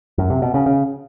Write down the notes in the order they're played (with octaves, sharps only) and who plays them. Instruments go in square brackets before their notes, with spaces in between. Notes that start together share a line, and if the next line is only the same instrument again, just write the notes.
[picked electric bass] F#2
C3
B2
C#3
C#3